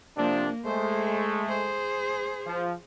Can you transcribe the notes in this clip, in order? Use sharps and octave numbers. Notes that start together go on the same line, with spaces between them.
C3 F3 A#3 D4
G#3 A3 C5
G#4 C5
F3